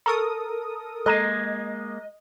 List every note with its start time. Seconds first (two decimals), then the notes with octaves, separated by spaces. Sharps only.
0.06 A4 A#4 A#5 C#6 D#6
1.06 G#3 A#3 A4 D#5 A#5 D#7